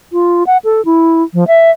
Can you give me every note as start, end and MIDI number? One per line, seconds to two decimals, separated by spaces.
0.13 0.44 65
0.47 0.58 78
0.64 0.84 69
0.85 1.23 64
1.34 1.44 53
1.48 1.71 76